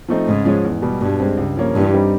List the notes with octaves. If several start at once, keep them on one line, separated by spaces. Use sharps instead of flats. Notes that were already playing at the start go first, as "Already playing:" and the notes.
F3 A3 C4 D#4
G#2 C#3
F3 G#3 C#4
E2
B2 G3
G2 B2
G#3 C4
C#2
C#3 F3 A#3 C#4
G2 E3
G3 C4 D#4